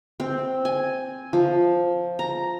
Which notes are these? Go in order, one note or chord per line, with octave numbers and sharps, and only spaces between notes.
C4
G#5
F3
A#5